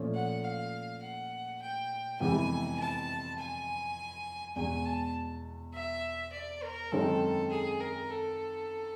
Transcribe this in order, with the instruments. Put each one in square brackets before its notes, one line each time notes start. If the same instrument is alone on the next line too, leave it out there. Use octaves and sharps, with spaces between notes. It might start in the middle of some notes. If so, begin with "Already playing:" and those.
Already playing: [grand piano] A#2 F3 A3 C#4
[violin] F#5
F5
F#5
G5
[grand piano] F2 C3 E3 G#3 B3 [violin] G#5
[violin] A5
G#5
[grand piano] E2 B2 G#3 [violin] G#5
[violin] A5
E5
D5
A#4
[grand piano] F#2 D#3 G#3 C4 D#4 [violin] A4
[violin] G#4
A#4
A4